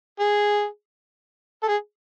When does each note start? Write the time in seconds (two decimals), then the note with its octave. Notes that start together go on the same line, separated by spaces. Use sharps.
0.20 G#4
1.63 A4
1.68 G#4